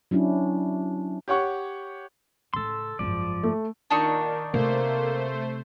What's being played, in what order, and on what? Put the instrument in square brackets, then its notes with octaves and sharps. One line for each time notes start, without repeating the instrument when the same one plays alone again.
[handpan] F#3 C#4 D4 E4
[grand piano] G4 C#5 F#5 C#6
[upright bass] A2 C#3 [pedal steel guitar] A4 C6
[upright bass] G#1 F#2 [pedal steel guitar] F3 D5
[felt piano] A3
[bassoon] A#2 [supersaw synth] D#3 [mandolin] D4 D#4 C#6
[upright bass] C3 [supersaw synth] A3 C5 [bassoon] A#3